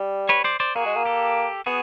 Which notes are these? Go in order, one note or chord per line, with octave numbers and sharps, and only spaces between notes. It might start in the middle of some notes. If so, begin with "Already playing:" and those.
Already playing: G3
B4 C#5
C5 D5
C5 D5
A#3 F#4 G#4
G#3
A#3
G4 A4
B3 F#4 G#4